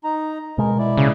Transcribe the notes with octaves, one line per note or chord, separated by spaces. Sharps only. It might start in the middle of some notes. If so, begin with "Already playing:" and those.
D#4 A#5
B2 G#3 A#4
E4 D5
C#3